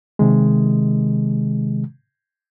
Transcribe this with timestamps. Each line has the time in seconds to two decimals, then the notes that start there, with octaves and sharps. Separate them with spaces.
0.19 C3 D#3 G#3